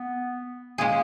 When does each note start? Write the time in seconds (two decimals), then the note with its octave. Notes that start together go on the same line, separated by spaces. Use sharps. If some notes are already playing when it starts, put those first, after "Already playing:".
Already playing: B3
0.78 G#3 A#3 C#4 F4 G#4